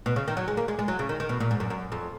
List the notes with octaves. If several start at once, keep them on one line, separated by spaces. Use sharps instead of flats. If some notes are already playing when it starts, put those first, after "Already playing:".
B2
C#3
D#3
F#3
G#3
A#3
G#3
G#3
F#3
C#3
D#3
D#3
B2
A#2
G#2
F#2
F#2
F2